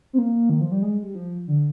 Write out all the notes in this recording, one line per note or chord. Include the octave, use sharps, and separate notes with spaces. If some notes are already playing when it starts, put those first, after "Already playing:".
C4
A#3
D#3
F3
G3
G#3
G3
F3
D3